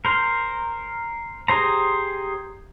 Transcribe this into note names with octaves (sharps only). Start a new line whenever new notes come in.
A#4 C5
G4 G#4 C5 A#5